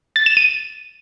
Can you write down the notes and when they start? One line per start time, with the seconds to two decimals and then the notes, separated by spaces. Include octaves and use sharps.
0.16 A6
0.26 E7
0.37 D#7